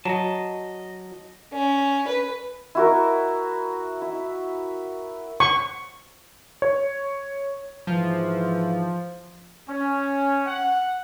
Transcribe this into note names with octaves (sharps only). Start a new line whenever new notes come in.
F#3 D#5 A5
C#4
B4
E4 F#4 A#4
E4
C#6
C#5
G#2 E3 F3
C#4
F#5